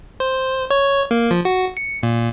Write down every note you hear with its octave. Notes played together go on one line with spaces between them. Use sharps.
C5
C#5
A#3
F3
F#4
C#7
A#2